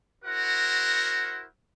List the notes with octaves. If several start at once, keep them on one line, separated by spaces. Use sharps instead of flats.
E4 F#4 A#4 C5 F#5